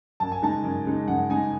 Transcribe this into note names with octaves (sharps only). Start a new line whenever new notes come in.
F#2 A5
G#5
C#3 G#3 D#4 A5
F#2
C#3 G#3 D#4
F#2 F#5
C#3 G#3 D#4 G#5